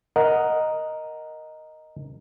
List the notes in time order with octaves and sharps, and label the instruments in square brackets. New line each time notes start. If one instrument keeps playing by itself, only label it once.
[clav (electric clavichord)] A#4 D#5 F#5